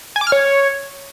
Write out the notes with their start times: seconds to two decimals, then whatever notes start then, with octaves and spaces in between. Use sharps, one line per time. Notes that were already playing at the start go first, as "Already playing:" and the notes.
0.16 G#5
0.21 D6
0.27 F6
0.32 C#5